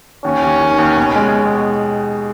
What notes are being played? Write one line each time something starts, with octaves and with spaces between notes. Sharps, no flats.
D#2 C#4
D#2
D#3
D#2
B2
G#3
B2